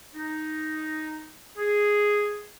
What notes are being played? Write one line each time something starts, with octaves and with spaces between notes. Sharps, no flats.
D#4
G#4